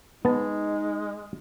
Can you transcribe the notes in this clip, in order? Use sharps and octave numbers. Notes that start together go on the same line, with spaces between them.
G#3 B3 D#4 A5